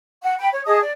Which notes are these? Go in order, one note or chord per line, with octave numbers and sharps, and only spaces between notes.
F#5
G5 B5
C#5
G#4 D#5 A5 D#6
D5